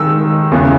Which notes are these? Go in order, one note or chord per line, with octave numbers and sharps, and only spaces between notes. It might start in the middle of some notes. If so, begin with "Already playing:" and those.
Already playing: D#3 G#3 D#4 E6
E2 C#3 E3 B3